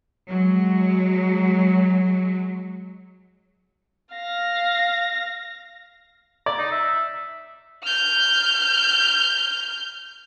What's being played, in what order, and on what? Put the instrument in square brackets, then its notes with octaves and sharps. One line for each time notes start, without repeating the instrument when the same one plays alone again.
[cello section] F#3 G#3
[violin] F5 A#6
[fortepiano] D5
[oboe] D#4
E5
[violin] F6 G6